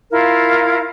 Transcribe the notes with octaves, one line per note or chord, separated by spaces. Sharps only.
E4 F4 A#4 F5